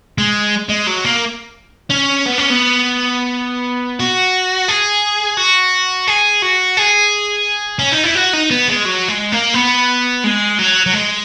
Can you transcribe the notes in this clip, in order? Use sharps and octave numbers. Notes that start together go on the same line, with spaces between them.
G#3
G#3
F#3
A#3
C#4
B3
C#4
B3
F#4
G#4
F#4
G#4
F#4
G#4
C#4
D#4
E4
F#4
D#4
B3
G#3
F#3
G#3
A#3
B3
G#3
F#3
F#3
G#3